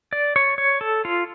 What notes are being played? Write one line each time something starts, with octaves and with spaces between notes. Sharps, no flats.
D5
C#5
C#5
A4
F4